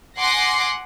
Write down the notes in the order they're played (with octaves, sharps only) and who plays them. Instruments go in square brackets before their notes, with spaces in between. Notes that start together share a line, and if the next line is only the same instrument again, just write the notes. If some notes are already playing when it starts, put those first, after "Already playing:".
[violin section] F#5 G#5 C6 D6 A#6 C7